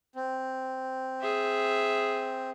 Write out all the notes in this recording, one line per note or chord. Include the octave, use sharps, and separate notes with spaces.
C4
G#4 E5